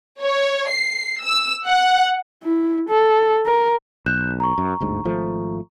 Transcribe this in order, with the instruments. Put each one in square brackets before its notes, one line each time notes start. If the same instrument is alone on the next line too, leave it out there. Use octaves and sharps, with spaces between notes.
[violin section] C#5
C7
E6
F#5
[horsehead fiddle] E4
A4
A#4
[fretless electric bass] B1 [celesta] F#6 G6 E7
[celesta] A#5 C#6
[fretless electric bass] F#2
G1 D2 G#2
G#1 F3 A3